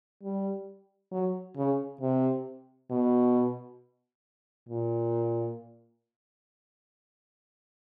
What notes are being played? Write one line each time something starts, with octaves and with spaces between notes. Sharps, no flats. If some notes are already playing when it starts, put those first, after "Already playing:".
G3
F#3
C#3
C3
B2
A#2